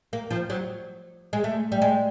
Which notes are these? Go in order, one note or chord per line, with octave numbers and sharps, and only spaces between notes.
A#3
F3
F#3
G#3
A3
G3
G#3